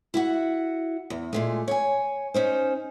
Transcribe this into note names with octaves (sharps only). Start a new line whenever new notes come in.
E4 F#4 F#5
E2
A#2 G#3 A3
C#5 G#5
C#4 D#4 C5